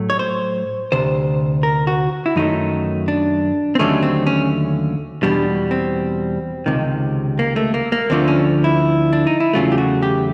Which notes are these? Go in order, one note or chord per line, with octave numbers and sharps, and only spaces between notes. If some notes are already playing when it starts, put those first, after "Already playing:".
Already playing: A2 F#3 A3
C#5
C5
D2 C3 C5
A#4
F#4
E4
F#2 D#3 F#3 A3 D#4
D4
C4
D#2 D3 F#3 A3 C#4
C4
C#4
E2 B2 G3 D4
C4
C#2 C3 D#3
A#3
A3
A#3
A#3
D2 D3 F3 A3 C4
C#4
E4
D4
D#4
E4
E2 C#3 F#3 A3 F4
G4
F#4
G4